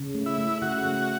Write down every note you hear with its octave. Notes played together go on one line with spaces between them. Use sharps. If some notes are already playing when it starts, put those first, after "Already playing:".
Already playing: C#3
A3
E4
A3
C#3 F#4
A3